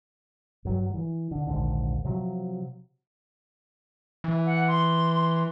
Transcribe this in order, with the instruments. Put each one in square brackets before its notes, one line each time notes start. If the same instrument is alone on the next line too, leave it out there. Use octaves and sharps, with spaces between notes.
[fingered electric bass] G2 F#3
E3 F#3
D3
A#1 D#2 G#2 D3
C3 F3 F#3
[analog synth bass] E3
[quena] F#5
C6